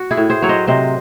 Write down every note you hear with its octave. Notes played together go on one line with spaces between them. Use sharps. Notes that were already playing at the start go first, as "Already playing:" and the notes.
Already playing: F#4
E4 G#4
A2
G#4 C5
F#3 C#5
C5 D#5
C3 C5 D#5